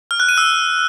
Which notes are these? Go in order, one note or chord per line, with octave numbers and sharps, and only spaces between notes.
F6
F#6
D#7
E6